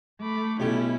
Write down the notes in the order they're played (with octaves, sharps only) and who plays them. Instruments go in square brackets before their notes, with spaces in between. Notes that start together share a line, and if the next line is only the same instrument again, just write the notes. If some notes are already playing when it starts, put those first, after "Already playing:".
[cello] A3 [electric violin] B5 D6
[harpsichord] B1 G4 [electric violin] C#4 E4